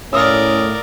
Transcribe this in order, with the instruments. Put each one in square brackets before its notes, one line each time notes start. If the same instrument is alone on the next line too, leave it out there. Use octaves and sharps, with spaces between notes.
[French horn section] A2 [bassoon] C#4 [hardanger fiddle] A#4 D5 [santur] F5 D#6 E6